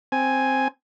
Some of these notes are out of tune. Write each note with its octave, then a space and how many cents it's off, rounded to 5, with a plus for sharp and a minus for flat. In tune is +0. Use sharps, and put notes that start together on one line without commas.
C4 +0 G#5 +0